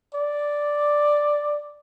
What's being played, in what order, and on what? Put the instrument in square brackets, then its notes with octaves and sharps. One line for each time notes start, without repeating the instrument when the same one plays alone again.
[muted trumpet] D5